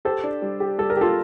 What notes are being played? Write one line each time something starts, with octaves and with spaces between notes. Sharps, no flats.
G4 A4 C5
D4
G3
G4
G3 A4
A#4
F4 G4 A4